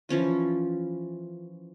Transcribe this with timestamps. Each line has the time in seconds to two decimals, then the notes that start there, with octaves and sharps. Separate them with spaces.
0.09 E3 F3 C#4 F4